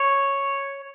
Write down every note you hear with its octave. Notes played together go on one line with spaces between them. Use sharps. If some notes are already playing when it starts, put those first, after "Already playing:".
Already playing: C#5